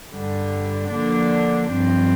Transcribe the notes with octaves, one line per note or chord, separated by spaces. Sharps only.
G2 D3 G3
D3 F3 A#3 D4
G2 F3 C4